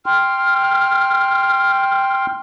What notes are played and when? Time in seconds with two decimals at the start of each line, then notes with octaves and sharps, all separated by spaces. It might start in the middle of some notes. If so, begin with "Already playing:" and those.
0.06 G5 C6 F6